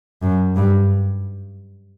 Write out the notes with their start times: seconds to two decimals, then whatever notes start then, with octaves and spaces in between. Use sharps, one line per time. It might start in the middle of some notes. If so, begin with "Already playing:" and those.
0.22 F#2
0.56 G2